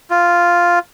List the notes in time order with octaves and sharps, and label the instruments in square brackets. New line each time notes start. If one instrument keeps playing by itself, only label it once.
[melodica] F4